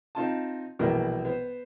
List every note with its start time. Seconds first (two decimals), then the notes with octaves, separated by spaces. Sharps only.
0.15 C4 D#4 F4 A5
0.79 A#1 B2 E3 G3 A#4
1.25 B3 C5